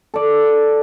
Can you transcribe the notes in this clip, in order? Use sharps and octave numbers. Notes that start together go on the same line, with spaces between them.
A4 D5